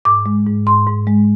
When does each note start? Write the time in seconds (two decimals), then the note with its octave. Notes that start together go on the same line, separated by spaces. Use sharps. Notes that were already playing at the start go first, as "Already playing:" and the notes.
0.05 G#2 D6
0.26 G#3
0.47 G#2
0.67 G#2 C6
0.87 G#2
1.07 G#3